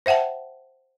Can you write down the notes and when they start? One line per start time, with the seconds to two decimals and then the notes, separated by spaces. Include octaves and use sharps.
0.06 C5 E5 F#5 G5 A5